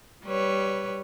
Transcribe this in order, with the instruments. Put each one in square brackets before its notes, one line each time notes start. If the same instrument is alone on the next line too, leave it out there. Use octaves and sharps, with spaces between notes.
[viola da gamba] G3 B4 C#5